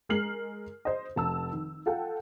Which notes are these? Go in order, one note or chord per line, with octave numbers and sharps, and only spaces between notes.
G#3 A#4 F6 C7 F#7
C5 D#5
F1 A5 E6
D#3
F4 A4 F#5 G5